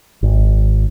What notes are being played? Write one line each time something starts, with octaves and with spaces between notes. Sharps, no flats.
G#1